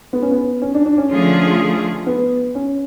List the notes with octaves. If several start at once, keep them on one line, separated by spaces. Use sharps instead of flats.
B3
C#4
B3
C#4
D4
D4
C#4
D3 F3 A3 F4 G#4
B3
C#4